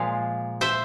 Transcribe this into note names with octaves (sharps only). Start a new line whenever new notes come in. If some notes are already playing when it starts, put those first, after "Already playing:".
Already playing: A#2 F3 G#3 F5
C5 E5